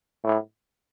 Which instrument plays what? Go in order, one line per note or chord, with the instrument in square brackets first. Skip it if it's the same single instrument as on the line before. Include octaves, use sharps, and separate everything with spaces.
[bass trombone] A2